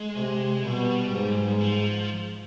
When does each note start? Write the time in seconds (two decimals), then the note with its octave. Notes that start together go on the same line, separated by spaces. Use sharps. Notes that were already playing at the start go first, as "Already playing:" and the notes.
Already playing: G#3
0.16 C3
0.64 B2 G3
1.12 G#2
1.61 F3